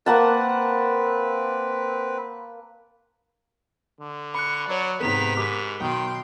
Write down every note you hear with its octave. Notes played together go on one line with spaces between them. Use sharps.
A#3 C4 B4 F#5 A5
D3
B5 C#6 F#6
F#3 C#5 D5
G#2 C3 D#3 B3 B6 F7
G#2 G4 A#4 D6
B1 D#3 G5 C6